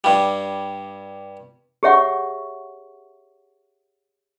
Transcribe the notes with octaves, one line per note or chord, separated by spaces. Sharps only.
G2 G3
G4 G#4 C#5 E5 F#5 C#6